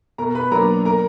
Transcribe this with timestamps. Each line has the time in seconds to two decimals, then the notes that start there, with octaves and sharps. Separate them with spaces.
0.18 B2 A#4 A#5
0.35 B4 B5
0.51 F#3 A#3 D4 A#4 A#5
0.85 A#4 A#5